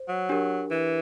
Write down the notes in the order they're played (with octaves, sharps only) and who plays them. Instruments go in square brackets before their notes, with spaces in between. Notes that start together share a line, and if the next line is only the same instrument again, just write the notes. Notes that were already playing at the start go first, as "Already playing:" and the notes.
Already playing: [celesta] C5
[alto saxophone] F#3
[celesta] D4 G4 A#4
[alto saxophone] E3